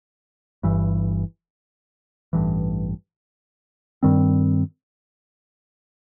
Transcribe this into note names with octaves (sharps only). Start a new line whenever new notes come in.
G1 G2 E3
A1 G2 E3
G2 D#3 G3 C4